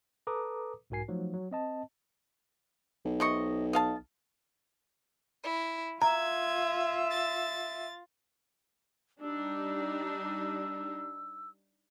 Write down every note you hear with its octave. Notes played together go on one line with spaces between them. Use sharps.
A4 B4 A#5 D6 D#6
B1 G#2 F#4 A#4 G#5 C7
F3 F#3 A3 D#4
F#3
C4 D#5 A5
B1
C3 D#5 C#6
D#5 F5 A5
E4
F4 E5 A#5 G#6
A6
G3 D4 D#4 E6